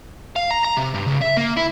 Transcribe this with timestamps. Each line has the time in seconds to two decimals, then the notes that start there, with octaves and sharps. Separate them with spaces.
0.36 F5
0.51 A#5
0.64 A#5
0.77 C3
0.94 G2
1.07 C#2
1.21 E5
1.37 A#3
1.57 E4